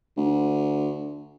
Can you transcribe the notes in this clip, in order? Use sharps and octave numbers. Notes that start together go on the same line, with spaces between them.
D2